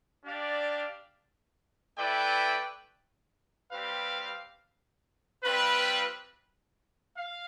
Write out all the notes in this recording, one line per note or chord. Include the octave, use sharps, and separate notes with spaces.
D4 G4 D5 F5
A3 E4 B4 D5 G5
G3 C4 G4 B4 F5
G3 C4 F4 B4
F5